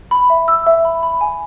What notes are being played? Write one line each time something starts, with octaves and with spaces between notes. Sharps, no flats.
B5
E5
E6
E5
B5
B5
G#5